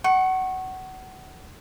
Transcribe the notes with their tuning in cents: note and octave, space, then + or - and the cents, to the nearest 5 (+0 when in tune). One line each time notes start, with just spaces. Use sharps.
F#5 +25 C#6 -20